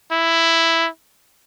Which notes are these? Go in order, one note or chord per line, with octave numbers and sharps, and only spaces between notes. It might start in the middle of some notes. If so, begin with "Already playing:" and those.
E4